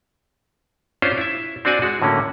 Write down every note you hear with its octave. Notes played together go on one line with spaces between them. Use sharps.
C#4 D4 F4 C5
E4 E5
C4 D4 F#4 D5 G#5
G#3 F#4
A2 D3 A#3 C#4